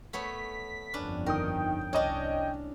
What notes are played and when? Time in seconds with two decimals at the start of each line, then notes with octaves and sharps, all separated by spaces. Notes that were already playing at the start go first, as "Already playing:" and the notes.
0.13 A3 B3 C#5 B6
0.94 G1 F2 C#4 D4 B4
1.26 D#3 D#4 A#4 G5 D#6
1.93 C2 C#4 D4 C#5 D#5